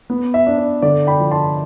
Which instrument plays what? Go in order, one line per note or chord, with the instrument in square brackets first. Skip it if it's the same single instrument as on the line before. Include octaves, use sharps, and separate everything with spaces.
[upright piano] B3
E5
D4
D5
D3 D5
G5 B5
F3
A5 C6